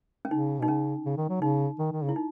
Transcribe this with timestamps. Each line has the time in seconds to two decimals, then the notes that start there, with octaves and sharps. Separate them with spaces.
0.25 C#4
0.31 C#3 D#4
0.60 B2 D#4
0.68 C#3 C#4
1.05 C#3
1.17 D#3
1.29 F#3
1.41 C#3 D#4
1.79 D#3
1.92 D#3
2.04 C#3
2.09 E4
2.16 D#4